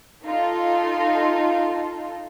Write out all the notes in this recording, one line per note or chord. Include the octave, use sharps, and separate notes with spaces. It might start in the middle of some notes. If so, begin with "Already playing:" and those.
D#4 F4 A4 C6